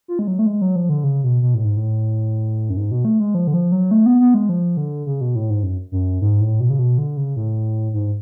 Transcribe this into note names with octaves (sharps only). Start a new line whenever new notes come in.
F4
G#3
F#3
A3
G#3
F#3
F3
D3
C#3
B2
B2
A2
G#2
A2
F#2
G#2
B2
A3
G#3
F3
D3
F3
F#3
A3
B3
B3
G#3
F3
D3
C#3
B2
A2
G#2
F#2
F#2
G#2
A2
B2
C#3
B2
D3
C#3
A2
G#2